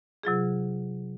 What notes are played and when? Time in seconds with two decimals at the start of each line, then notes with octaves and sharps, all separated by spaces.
0.23 C3 F#3 F4 G#4